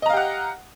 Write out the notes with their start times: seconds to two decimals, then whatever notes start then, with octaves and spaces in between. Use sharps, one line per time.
0.02 D#5
0.06 A#5
0.09 F5
0.13 G4
0.17 F#5